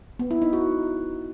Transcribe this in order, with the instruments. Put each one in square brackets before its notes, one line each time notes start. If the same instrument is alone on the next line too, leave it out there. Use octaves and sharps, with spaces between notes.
[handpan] B3
E4
D#4
F#4